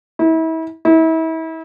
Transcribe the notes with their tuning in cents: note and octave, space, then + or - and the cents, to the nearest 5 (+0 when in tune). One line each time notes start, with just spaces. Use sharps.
E4 -35
E4 -35